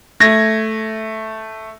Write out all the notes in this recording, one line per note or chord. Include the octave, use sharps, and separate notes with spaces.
A3 G#6 A#6